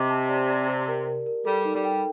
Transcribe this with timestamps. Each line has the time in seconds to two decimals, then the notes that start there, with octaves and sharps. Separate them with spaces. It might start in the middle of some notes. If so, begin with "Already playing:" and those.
Already playing: C3 D#5 D6
0.09 A5
0.29 D5
0.49 D5
0.68 G4
0.88 A#4
1.07 A#4
1.26 A#4
1.45 G3 A4
1.65 D#4
1.74 G3
1.85 G5